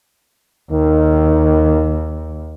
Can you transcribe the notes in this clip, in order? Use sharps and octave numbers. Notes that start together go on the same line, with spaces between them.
D#2 D#3